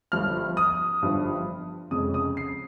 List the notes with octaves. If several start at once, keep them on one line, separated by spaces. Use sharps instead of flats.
G1 G2 F3 F6
D#6
G1 G2 F3
F1 F2 C#3 G#3 C#4 D#6
D#6
C7